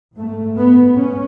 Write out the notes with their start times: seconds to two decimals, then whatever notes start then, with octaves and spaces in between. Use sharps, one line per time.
0.16 G#2 A3
0.56 B3
0.96 G#2 C#4